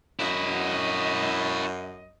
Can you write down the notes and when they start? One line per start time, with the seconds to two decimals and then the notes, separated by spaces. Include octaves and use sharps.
0.19 F#2 E4 F#4 D#5